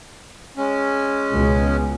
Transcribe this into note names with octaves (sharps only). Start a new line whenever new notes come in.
G#3 C#4
C#2 B2